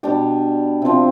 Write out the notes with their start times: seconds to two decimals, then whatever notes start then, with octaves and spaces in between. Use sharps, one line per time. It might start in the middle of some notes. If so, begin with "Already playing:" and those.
0.03 B2 G3 D4 G4
0.82 C3 F3 C4